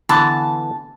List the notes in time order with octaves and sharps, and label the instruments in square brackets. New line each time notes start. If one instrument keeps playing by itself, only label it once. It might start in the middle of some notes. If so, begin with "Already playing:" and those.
[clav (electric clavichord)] D3 E3 B3 [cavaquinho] A5